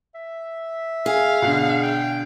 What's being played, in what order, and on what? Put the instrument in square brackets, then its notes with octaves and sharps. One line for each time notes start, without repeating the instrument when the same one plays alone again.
[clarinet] E5
[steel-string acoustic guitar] G#4 [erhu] F5
[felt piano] B2 D3 [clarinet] F#5
[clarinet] G5